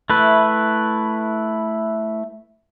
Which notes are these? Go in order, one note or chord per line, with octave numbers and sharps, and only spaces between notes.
A3 E4 B4